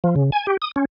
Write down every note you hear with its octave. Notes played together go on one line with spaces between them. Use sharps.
F3
C#3
G#5
G4
D#6
C#4